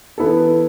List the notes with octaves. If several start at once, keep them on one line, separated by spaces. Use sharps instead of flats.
E3 B3 E4 A4